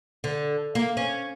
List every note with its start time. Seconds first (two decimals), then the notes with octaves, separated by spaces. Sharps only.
0.24 D3
0.75 A#3
0.97 C#4